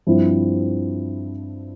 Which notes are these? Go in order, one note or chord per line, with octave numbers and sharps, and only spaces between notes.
G2 F3 C4 E4